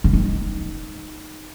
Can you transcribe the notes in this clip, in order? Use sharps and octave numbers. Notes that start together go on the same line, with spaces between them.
C#3
D#3